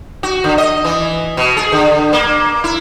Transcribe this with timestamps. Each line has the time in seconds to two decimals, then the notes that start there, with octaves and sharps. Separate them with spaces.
0.23 F#4
0.44 D3
0.58 D#5
0.85 E3
1.37 B2
1.57 G#4
1.72 D3
2.13 A#3
2.64 E4